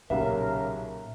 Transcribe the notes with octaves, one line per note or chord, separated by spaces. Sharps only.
B1 A#2 C#3 G4 A#4 E5 F5